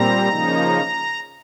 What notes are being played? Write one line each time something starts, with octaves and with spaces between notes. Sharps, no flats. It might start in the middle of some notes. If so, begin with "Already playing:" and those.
Already playing: A#2 G3 C4 A#5
C#3 F3 A#3 D#4